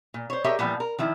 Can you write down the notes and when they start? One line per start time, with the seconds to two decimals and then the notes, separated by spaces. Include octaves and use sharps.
0.14 A#2
0.30 C5 C#5
0.44 G4 G#4 A#4 C#5 D#5 E5
0.59 A#2 E3 F3 G3 B3
0.80 A#4
0.99 D#3 F3 E4